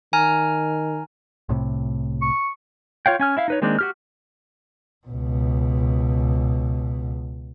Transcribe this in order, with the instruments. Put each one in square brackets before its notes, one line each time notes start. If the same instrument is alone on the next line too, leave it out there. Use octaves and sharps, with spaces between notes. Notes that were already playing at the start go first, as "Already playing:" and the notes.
[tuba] D#3 [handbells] G#5 A#5 F6
[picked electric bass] C2 A2 C3
[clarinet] C#6
[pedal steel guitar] F4 C#5 F5 G5
C#4 G#5 F6
E4 E5 F5
D#4 B4 C#5
D#3 G#3 A#3 C4 D4
F#4 G4 F6
[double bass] C#2 B2